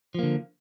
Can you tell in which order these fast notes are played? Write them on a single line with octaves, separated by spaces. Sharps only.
F3 A#3 D3